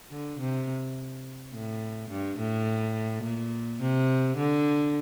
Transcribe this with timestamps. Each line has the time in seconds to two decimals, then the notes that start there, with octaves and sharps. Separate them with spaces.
0.11 D3
0.40 C3
1.54 A2
2.10 G2
2.39 A2
3.24 A#2
3.81 C3
4.37 D3